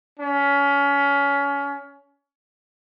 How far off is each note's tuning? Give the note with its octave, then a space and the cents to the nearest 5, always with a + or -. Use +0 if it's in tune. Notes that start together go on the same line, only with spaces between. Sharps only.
C#4 +25